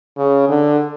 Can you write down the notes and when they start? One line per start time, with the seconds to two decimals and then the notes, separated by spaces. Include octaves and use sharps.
0.17 C#3
0.49 D3